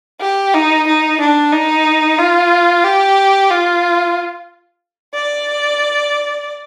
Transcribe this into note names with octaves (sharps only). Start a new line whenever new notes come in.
G4
D#4
D#4
D4
D#4
F4
G4
F4
D5